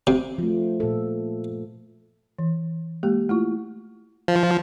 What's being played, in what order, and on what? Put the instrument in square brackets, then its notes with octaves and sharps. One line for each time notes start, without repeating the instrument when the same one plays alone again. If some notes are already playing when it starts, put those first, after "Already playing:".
[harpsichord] C3
[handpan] F3 A3
A#2 A4
[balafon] E3
G#3 A#3 G4
A3 E4 F4
[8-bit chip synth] F3